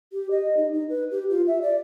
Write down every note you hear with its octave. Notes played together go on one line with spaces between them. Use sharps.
G4
D#5
D#4
D#4
B4
G4
F4
E5
D5